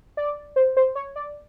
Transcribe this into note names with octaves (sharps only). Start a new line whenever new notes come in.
D5
C5
C5
C#5
D5